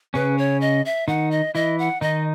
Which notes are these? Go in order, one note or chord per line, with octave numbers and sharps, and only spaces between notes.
C#3 C#4 B4
C#5
D#5
E5
D#3 D#4 F#5
D#5
E3 E4 D#5
F#5
D#3 D#4 D#5